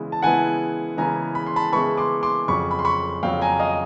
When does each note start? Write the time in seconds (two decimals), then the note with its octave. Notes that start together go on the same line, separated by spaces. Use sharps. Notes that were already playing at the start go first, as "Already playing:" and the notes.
Already playing: C#3 E3 G#3 B3 E4
0.12 A5
0.22 C#3 E3 G#3 B3 E4 F#5 G#5
0.98 C#3 E3 G#3 B3 E4 G#5 A#5
1.35 B5
1.46 C6
1.56 A5 B5
1.73 C#3 E3 G#3 B3 E4 B5 C#6
1.98 C6 D6
2.23 C6 D6
2.48 F2 C#3 F#3 B5 C#6
2.71 B5
2.79 C6
2.85 B5 C#6
3.23 F2 C#3 F#3 F5 G5
3.42 G#5 A#5
3.60 D#5 F5